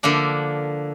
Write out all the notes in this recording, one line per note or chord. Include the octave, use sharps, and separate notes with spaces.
D3 F3 A#3 D4